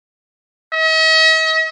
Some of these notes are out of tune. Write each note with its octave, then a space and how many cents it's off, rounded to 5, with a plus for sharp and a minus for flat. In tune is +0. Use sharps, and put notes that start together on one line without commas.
D#5 +45